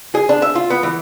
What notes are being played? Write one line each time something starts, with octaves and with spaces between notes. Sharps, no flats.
G#4
D4
E5
F4
B3
E3